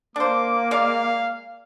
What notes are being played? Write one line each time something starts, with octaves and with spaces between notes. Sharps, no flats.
A#3 D4 C5 D6
G#3 D5 F5